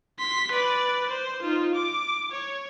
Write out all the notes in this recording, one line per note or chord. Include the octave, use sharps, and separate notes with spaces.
C6 B6
B4 D5
C5
D#4 F4
D6
C#5